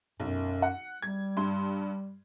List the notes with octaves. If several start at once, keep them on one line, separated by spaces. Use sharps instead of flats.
B1 F#2
F#5
G3 G#6
G2 C6